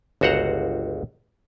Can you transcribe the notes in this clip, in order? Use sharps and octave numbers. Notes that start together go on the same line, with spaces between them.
G1 C#2 F#4 C5 F#5 A#5